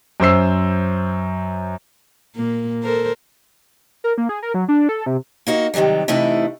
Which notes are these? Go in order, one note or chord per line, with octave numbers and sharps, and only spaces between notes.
F#2 C5 E6 C7
A#2 A#3
A4 A#4 C5
A#4
A#3
G#4
A#4
F#3
D4
A4
C3
A#3 D#4 F#4
C3 D#3 E3 F#3 G3
C3 E3 A3 D#4 E4 B4